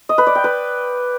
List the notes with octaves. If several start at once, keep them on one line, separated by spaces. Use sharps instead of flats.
D#5
B4
D5
G5
B4